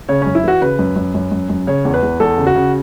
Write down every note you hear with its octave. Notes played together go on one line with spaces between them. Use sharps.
C#3 C#5
F#2 C#4
E4
E3 F#4
C#3 B4
F#2
F#2
F#2
F#2
F#2
C#3 C#5
E2
B4
E2
E2 A4
C#3
F#4
C#3